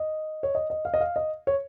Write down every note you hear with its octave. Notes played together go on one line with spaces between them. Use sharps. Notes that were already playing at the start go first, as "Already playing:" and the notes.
Already playing: D#5
C#5
D#5
D#5
F5
D#5
F5
D#5
C#5